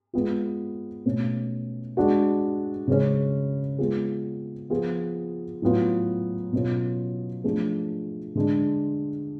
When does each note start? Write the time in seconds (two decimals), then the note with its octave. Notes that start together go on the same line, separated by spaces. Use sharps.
0.13 G#3 B3 F4
1.06 B2 A3 C#4
1.97 G#3 D4 F#4
2.88 C#3 G#3 C#4
3.78 G#3 B3 F4 G#4
4.70 F3 B3 F4 G#4
5.62 A2 F#3 B3 F4
6.52 B2 F#3 C#4 F4
7.44 F3 A3 D4 F4 G#4
8.35 D3 G#3 D4